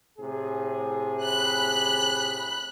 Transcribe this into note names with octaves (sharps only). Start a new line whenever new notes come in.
A2 C3 G#4
B5 F#6